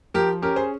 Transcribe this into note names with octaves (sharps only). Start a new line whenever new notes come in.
F3 G4 A#4
C#4 G4 A#4
G#4 C5